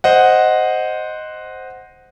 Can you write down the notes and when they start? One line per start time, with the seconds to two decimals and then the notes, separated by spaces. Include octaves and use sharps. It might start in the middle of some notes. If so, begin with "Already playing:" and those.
0.04 C5 D#5 F#5